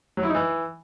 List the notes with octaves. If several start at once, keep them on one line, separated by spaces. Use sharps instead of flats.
F#3
E4
D#4
E3